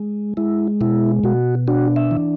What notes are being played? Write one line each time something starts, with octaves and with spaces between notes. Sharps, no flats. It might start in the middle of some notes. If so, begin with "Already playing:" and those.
Already playing: G#3
G#3 E4
B2 E4
B2 F#4
D4 F#4
E5
E3